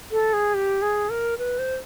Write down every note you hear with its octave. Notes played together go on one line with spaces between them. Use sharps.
A4
G#4
G4
G#4
A#4
B4
C5